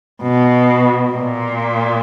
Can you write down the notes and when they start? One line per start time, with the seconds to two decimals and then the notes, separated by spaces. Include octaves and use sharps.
0.23 B2
1.12 A#2